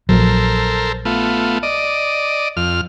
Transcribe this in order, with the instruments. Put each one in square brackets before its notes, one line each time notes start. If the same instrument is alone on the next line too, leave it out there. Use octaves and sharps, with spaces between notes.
[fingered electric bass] A#1 F#3 [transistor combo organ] A4 A#4 C5
[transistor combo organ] A3 B3 F4
D5 D#5
F2 F6